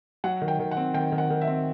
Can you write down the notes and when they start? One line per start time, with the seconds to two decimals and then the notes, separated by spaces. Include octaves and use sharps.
0.24 F#3 F#5
0.42 D#3
0.48 G5
0.59 D#3
0.71 F#5
0.77 C4
0.94 D#3 G5
1.12 D#3
1.18 F#5
1.30 D#3
1.41 E5
1.48 C4